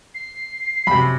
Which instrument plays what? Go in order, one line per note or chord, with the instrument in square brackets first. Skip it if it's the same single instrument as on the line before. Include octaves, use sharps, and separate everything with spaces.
[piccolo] C7
[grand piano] F#2 C3 [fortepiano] B5